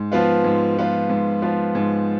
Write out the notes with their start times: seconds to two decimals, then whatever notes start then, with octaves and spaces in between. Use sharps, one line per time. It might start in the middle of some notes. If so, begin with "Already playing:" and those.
Already playing: G#2
0.12 F3 B3 F4
0.44 G#2
0.77 F3 B3 F4
1.09 G#2
1.42 F3 B3 F4
1.75 G#2